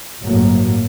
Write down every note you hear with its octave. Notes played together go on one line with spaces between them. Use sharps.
G1 A2 F#3 A#3